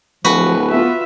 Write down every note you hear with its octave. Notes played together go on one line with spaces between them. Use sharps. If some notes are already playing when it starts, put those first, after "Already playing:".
D1 F3 F#4 B4
B3 F4 E5